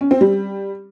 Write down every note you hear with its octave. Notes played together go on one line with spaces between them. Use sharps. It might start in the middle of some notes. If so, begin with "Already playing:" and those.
C#4
C4
G3